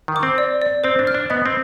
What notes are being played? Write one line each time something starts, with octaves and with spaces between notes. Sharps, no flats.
D#3
D6
C4
D5
D5
C4 C5
D4
F6
D4
B3 D#5
C4